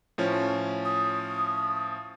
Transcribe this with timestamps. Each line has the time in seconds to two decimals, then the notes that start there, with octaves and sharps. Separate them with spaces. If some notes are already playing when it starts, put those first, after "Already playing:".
0.18 A2 F3 C#4
0.85 D#6